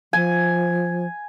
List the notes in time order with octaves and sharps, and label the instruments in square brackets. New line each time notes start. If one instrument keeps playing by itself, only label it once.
[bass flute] F3 [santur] G#5